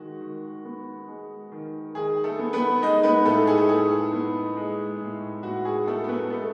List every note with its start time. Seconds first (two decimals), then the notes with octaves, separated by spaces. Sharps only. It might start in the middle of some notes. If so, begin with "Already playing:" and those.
Already playing: D#3 G#3 F#4
0.21 D#3
0.65 B3
1.08 G#3
1.52 D#3
1.95 D#3 G#4
2.24 A3 A4
2.39 B3
2.53 B3 B4
2.82 G#3 D#4 D#5
3.03 B3 B4
3.25 A2 A3 A4
3.47 G#4
3.58 A4
3.69 A2 G#4
4.13 B3
4.57 G#3
5.00 A2
5.43 A2 F#4
5.65 G#4
5.87 A3 B3 A4
6.04 A4
6.08 B3 B4
6.30 G#3 A3 A4